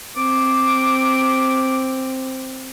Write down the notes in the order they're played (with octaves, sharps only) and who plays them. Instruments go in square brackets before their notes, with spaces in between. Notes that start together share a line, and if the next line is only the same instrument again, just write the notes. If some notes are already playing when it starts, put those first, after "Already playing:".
[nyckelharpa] C4 [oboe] D6